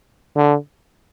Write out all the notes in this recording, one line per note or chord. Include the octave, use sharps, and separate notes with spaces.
D3